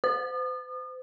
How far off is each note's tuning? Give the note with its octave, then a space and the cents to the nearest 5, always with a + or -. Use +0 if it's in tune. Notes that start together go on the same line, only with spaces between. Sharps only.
C5 -40 D#6 -40